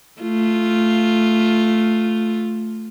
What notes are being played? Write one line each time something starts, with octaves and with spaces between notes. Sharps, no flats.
A3 F4